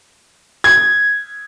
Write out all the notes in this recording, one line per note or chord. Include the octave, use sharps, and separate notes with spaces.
G#6